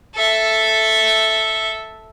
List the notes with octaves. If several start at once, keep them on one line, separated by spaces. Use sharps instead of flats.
A4 E5